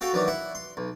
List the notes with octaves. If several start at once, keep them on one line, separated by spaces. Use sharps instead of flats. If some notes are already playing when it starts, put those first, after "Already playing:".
F#4 A4 F5 G5
D#3 E3 F#3 D4
E4 F#5
C6
B1